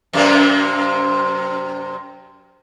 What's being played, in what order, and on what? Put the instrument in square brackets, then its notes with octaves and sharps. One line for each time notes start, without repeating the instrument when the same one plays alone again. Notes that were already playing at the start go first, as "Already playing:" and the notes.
[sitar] F#2 C3 A#3